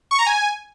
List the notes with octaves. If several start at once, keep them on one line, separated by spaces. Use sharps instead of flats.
C#6
A#5
G#5